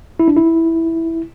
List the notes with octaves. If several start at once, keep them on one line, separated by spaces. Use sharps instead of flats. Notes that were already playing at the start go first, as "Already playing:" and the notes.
E4
D4
E4